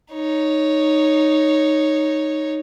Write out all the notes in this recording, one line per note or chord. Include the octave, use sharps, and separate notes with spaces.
D#4 C#5